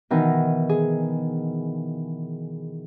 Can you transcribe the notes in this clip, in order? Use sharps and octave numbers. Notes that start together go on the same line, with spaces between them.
B2 D#3 E3 D#4
G#4